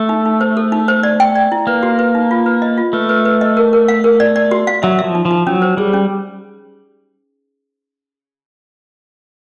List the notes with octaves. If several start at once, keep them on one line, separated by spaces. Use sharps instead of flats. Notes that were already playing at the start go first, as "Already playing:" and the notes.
Already playing: A3
D#4
D#4
C5
A4
D#4
C5
D5
G5
D5
E4
A#3 B4
F#4
B4
D#4
F4
B4
D#5
F4
A3 B4
B4
B4
D#5
A#4
A#4
F5
A#4
D5
D5
F#4
F5
F#3 E5
F3 E5
D#4
F3
D#4
F#3 C#4
C5
G3 G#4
C#4